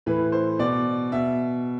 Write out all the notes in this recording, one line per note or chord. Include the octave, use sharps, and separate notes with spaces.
A2 E3 B4
C5
B2 D5
B2 E5